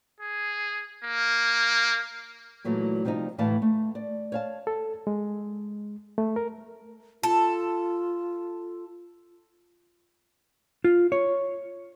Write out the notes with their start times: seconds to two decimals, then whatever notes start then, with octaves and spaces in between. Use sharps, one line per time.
0.20 G#4
1.04 A#3
2.65 A#2 E3 F#3 A3
3.05 C3 F3 G3 D4 D#4
3.38 D2 A2 E3 A3 F5 A5
3.62 A3
3.95 D5
4.32 C#5 F5 A5
4.67 A4
5.07 G#3
6.18 A3
6.36 A#4
7.23 F4 A4
10.84 F4
11.12 C#5